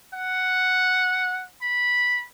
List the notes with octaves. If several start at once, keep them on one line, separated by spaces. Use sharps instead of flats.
F#5
B5